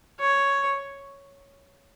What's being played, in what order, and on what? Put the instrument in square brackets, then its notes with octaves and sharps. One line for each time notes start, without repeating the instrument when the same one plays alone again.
[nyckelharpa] C#5